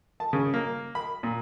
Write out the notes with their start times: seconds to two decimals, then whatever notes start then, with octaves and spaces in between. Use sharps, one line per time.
0.20 A5
0.33 C#3
0.54 A#3
0.95 B5
1.23 A#2